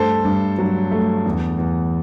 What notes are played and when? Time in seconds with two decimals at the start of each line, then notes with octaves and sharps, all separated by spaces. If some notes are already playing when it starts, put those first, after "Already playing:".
Already playing: G2 A3 A4 C5
0.25 G2
0.58 F#3
0.91 A3
1.26 E2
1.58 E2